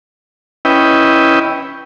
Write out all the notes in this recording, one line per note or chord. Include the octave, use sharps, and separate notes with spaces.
C#4 E4 B4 D#5 G5